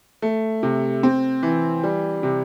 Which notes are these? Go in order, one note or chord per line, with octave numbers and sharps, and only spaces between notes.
A3
C3
C4
E3
G3
C3